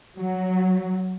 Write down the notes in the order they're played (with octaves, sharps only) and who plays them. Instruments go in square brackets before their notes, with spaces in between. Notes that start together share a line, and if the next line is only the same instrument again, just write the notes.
[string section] F#3